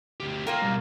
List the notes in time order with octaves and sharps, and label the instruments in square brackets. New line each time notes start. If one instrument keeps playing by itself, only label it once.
[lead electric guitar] D2 G4
[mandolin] A#3 F4 A#4 [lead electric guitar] C#5 G5
[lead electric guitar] B2 G3